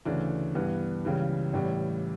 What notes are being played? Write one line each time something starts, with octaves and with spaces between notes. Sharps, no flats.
D2 C#3 E3 A3 D4
G2 E3 B3
C#2 C#3 E3 G3
A1 A2 E3 G3